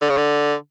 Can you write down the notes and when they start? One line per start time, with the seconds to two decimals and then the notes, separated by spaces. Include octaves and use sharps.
0.02 D3
0.10 C#3
0.17 D3